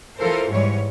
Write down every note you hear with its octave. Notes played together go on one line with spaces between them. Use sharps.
E3 F4 A4 A#4 C5
G#2 E3 G3 G#3 C#5